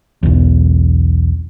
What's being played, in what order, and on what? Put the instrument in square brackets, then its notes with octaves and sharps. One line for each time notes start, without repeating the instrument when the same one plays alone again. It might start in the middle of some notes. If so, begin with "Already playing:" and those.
[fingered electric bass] B1 E2